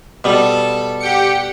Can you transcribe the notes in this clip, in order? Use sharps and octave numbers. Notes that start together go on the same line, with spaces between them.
B2 G3 A4
G4 F#5 G5 C#7